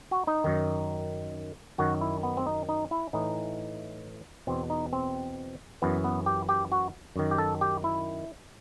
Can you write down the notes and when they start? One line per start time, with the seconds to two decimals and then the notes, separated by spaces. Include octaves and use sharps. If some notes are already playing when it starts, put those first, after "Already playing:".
0.11 F#4
0.27 D#4
0.44 F#2 D#3
1.78 F#2 D#3 F#4
2.01 E4
2.23 B3
2.37 C4
2.47 D#4
2.69 D#4
2.91 E4
3.13 A2 E3 D#4
4.47 E2 B2 C4
4.70 D#4
4.93 C4
5.82 F#2 E3 B3
6.04 B3
6.26 G4
6.49 G4
6.72 F#4
7.16 F#2 D#3
7.31 G4
7.38 A4
7.61 G4
7.84 E4